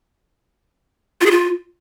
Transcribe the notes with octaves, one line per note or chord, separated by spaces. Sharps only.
F4
G#4
F4